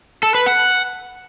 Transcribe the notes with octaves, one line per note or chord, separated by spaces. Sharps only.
A4
B4
F#5